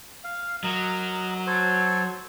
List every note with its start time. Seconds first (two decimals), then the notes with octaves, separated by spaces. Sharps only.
0.24 F5
0.64 F#3 A#4 D#5
1.47 A4 C5 C#5